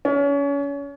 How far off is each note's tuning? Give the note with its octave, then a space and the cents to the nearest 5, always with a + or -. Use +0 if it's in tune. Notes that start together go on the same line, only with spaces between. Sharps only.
C#4 +30